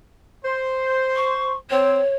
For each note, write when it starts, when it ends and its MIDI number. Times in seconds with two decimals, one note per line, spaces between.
0.44 1.54 72
1.16 1.54 85
1.70 1.99 60
1.70 2.16 73